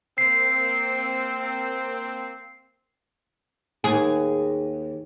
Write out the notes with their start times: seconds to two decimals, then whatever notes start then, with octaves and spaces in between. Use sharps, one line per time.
0.18 A#3 C4 C7
3.84 D#2 G#4